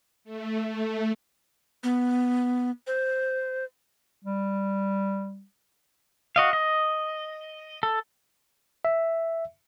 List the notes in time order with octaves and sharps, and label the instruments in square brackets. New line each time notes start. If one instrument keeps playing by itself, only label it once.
[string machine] A3
A3
[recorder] B3
C5
[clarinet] G3
[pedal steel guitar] F#4 D#5 F5
D#5
A4
[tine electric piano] E5